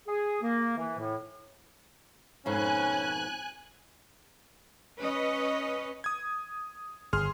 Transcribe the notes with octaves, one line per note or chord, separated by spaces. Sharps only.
G#4
A#3
E3
A2
F2 G#2 B2 C#4 G#5 F#6
C#4 B4 C#5 D#5
D#6 G#6
G1 G#4 C6 F6